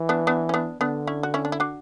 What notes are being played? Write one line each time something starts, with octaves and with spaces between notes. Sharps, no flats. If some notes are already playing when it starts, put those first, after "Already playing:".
Already playing: E3
B3 D4
B3 D4
C#4
B3 D4
D3 B3 D4
C#4 E4
F#4
C#4 E4
D4
E4
D4 F#4